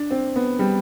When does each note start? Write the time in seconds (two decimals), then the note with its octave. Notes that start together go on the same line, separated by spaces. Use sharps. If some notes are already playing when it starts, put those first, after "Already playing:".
Already playing: D4
0.11 C4
0.36 B3
0.59 G3